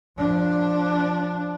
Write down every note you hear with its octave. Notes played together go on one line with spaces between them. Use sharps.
F3 D4